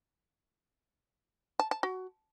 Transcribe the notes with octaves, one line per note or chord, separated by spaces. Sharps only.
A5
A5
F#4